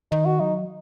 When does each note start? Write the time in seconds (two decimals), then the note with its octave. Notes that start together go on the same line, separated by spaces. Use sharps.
0.11 D#3 D#4
0.25 F#4
0.40 F#3 D#4